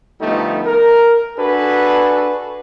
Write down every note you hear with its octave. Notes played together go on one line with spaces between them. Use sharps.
D3 F3 G3 A3 B3 D#4
A#4
D4 F#4 G#4 A4 B4